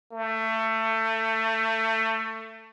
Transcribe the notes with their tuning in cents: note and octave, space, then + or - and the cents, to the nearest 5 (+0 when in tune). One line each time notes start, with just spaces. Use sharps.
A3 +25